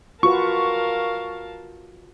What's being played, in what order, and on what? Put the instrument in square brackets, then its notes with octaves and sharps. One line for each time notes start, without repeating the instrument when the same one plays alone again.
[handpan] F4 F#4 B4 [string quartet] A#4 F5 A5 [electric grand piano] C#6